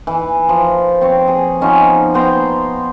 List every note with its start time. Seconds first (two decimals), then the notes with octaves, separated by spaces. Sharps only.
0.07 E3
0.49 F3
1.01 C4 C#5
1.27 G#4
1.61 F3 B3 C#4 D#4
2.14 B3 C5 G5 A#5